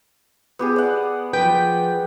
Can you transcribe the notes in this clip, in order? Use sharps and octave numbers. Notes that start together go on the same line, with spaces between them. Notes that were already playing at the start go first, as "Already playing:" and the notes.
B3 G4 G#4
D5 F#5
F3 B4 G5 G6